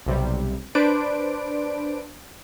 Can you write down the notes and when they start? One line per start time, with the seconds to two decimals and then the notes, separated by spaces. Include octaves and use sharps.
0.06 B1 C3 G3
0.75 D4 B4 C5 D5 D7